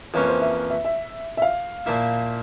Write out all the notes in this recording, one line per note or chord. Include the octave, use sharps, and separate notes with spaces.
F2 E3 A#3 C#4 C#5
C5
E5
E5
E5
E5
F5
A#2 F3 A#3 E4